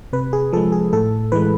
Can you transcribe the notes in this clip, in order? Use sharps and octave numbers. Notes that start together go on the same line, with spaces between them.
C3 B4
G#4
F3 G#3 A4
G#4
A2 A4
E3 G#3 B4